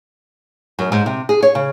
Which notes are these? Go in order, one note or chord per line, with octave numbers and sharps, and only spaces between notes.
F#2
G#2
C3
G#4
C#5
C#3